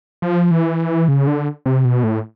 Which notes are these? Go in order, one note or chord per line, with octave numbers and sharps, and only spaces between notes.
F3
E3
C#3
D3
C3
B2
A2